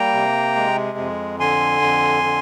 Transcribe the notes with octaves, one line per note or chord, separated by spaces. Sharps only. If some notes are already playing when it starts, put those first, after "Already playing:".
Already playing: G3 A#3 G5 A#5
C3
G#3
F2
D3 G#5 C6
F2
D3